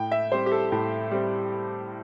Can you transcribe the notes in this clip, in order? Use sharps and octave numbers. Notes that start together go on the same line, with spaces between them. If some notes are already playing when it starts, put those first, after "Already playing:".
Already playing: A2 G5
E5
G3 C4 C5
G4
A4
A2
G3 C4